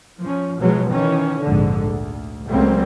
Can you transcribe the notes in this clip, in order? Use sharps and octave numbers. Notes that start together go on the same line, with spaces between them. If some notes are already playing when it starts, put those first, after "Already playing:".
F3 C#4
B2 F3 F#3 G#3
D#3 E3 C#4
A#1 F2 G#2 D3
D2
C#2 F#3 G3 A3 A#3 C4